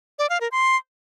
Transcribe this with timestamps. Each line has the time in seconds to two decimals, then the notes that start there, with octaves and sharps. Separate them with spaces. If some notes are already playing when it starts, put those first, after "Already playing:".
0.19 D5
0.30 F5
0.41 A#4
0.52 C6